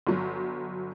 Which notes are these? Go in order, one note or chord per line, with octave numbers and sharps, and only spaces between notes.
G1 F#3